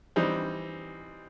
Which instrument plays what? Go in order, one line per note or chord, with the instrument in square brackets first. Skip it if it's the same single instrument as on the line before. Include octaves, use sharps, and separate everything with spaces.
[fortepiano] E3 G3 C4 D#4